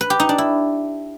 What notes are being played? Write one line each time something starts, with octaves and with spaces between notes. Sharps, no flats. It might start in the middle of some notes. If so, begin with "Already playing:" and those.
B4
G4
D#4
D4
E4